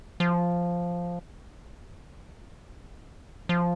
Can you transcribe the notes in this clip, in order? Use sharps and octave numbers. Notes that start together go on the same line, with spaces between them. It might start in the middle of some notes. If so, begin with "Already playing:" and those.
F3
F3